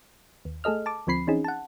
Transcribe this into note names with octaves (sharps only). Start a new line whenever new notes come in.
D#2
A3 G#4 A4 D#5 F6
A5 D6
D2 F3 C4 B5 C7
E3 C4 C#4 D#4 G#4
F#5 A5